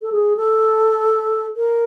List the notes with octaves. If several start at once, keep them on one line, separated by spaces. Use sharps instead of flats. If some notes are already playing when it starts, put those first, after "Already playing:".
A4
G#4
A4
A#4